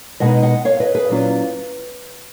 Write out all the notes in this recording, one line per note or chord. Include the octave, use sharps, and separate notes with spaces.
B2 G#3 B3 D#4 D#5 F#5
D#5 F#5
C#5 F5
B4 D#5
G#4 B4
A#2 F#3 C#4 F4